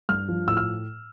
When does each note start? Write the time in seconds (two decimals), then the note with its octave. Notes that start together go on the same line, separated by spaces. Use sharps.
0.09 G2 F6
0.28 F3
0.47 A2 E6
0.57 F6